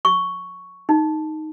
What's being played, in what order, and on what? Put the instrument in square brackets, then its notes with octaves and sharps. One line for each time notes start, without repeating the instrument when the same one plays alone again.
[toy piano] C#6
D#4